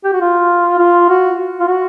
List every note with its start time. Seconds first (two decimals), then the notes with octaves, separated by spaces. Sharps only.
0.04 G4
0.13 F#4
0.21 F4
0.79 F4
1.09 F#4
1.60 F4
1.68 F#4